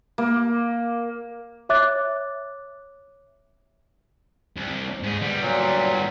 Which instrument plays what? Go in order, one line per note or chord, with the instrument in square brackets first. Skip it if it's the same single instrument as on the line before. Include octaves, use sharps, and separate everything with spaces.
[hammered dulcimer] A#3
[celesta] C#5 E5 D6 F#6 A6
[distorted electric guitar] C2
G#2 G#4
G3 B3
[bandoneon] A#2 F#3